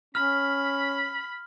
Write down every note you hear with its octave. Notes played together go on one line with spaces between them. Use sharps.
C#4 B5 F6